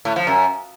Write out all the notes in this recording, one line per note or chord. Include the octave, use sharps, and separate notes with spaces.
A2
F3
F#2